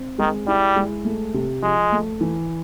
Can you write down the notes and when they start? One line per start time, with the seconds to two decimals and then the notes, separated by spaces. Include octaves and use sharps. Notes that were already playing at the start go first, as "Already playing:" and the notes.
Already playing: C4
0.18 D#3 G#3
0.47 G3 E4
0.76 G#3
1.05 A3
1.34 C3
1.62 F3 G#3
1.92 A3
2.21 E3